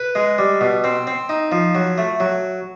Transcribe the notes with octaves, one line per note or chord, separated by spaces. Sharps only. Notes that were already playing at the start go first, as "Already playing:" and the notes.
Already playing: B4
G#3
G3
B2
C4
C4
D#4
F3
F#3
A3
F#3